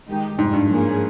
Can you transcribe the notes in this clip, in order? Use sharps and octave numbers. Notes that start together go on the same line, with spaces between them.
D#3 G#3 D#4 G4
F2 G#2 C3 G3
G2
F3 A#3 C#4 G#4